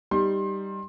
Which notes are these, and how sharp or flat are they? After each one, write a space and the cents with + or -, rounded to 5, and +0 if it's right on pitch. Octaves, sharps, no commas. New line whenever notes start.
G3 +0 D#4 +0 C6 +25